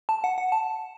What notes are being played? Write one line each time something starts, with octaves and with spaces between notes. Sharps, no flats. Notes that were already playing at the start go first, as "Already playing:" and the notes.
A5
F#5
F#5
A5